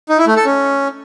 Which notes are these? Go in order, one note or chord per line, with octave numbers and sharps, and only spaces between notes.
D#4
E4
A3
A4
C#4